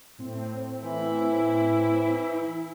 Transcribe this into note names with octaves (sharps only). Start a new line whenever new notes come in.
A2 C4
E3 E4